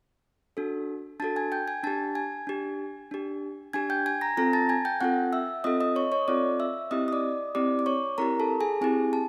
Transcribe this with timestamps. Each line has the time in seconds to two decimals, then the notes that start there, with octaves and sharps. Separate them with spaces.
0.57 D4 F#4 A4
1.20 D4 F#4 A4 A5 A6
1.36 G#5 G#6
1.52 G5 G6
1.67 G#5 G#6
1.83 D4 G4 A5 A6
2.15 G#5 G#6
2.47 D4 G4
3.11 D4 G4
3.73 D4 G4 G#5 G#6
3.90 G5 G6
4.06 G#5 G#6
4.21 A#5 A#6
4.37 C4 F4 A4 A#5 A#6
4.53 A5 A6
4.69 G#5 G#6
4.85 G5 G6
5.01 C4 F4 A4 F#5 F#6
5.33 E5 E6
5.64 C4 F4 A4 D#5 D#6
5.80 D#5 D#6
5.96 C#5 C#6
6.12 C#5 C#6
6.28 C4 F4 A4 D5 D6
6.60 E5 E6
6.91 C4 E4 G4 D#5 D#6
7.08 D#6
7.12 D5 D6
7.55 C4 E4 G4 D5 D6
7.79 D6
7.86 C#5 C#6
8.18 C4 E4 G4 A#4 A#5
8.40 A4 A5
8.60 G#4 G#5
8.81 C4 E4 G4 G#4 G#5
9.13 A5